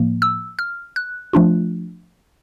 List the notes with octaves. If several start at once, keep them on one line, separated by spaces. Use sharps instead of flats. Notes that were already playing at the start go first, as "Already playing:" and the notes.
Already playing: A2 F3 A#3
E6
F6
F#6
F3 A3 D4 F4